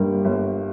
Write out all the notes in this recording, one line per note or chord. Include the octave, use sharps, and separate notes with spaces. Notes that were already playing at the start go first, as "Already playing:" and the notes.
Already playing: G1 G2 G3 A#3
G1